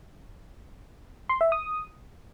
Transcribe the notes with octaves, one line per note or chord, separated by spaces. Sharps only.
C6
E5
D#6